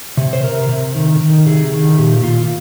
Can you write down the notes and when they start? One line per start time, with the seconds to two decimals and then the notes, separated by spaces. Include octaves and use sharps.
0.17 C3
0.33 C5
0.43 C3 A#4
0.69 C3
0.95 D#3
1.20 D#3
1.46 C3 G#4
1.72 D#3
1.98 A#2 G4
2.24 A#2 F4